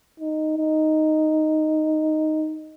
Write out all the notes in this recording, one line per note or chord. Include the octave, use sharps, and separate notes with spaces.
D#4
D#4